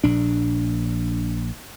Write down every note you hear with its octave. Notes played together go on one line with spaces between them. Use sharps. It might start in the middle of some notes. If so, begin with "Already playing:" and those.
A#1 D4